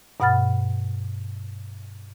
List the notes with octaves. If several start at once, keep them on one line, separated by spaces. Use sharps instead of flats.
G2 B2 F#5 B5 F6 A6